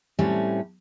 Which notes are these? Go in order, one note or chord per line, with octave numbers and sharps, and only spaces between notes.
A2 G3 A3 C4 C#4